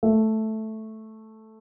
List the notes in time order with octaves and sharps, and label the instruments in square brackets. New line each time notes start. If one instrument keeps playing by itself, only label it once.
[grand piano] A3